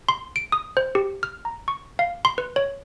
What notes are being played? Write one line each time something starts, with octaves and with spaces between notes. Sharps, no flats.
C6
D7
D#6
C5
G4
F6
A#5
C#6
F5
C6
B4
C#5